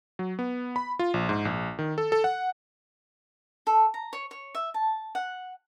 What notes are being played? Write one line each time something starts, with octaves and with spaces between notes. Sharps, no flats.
F#3
B3
B5
F4
A#1
G#2
A#1
D#3
A4
A4
F#5
A4
A#5
C#5
C#5
E5
A5
F#5